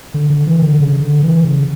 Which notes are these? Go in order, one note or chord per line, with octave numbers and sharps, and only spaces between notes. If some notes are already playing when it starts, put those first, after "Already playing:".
D3
D3
E3
D3
C#3
D3
E3
C#3